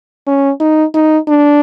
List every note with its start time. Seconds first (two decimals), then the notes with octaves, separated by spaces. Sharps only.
0.27 C#4
0.60 D#4
0.94 D#4
1.28 D4